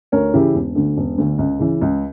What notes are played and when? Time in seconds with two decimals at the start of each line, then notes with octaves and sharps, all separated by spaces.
0.12 D2 A#4 C#5
0.34 C#3 E3 E4 G4
0.54 E1
0.75 D2 D3
0.97 E1
1.18 D2 D3
1.38 C#2
1.59 C#3 E3
1.81 C#2